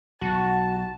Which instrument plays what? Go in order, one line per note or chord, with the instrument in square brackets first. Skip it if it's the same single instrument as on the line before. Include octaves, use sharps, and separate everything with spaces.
[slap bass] B1 [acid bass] F#4 [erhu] A5